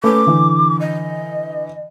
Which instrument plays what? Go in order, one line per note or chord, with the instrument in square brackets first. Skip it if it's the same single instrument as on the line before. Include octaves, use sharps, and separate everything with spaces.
[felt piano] A3 C#4 B4 [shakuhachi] D6
[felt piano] D3 E3
[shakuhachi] D#5